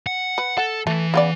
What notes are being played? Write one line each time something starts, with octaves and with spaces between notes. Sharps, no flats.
F#5
B4
A4 F#5
E3 A3
C#3 B3 D5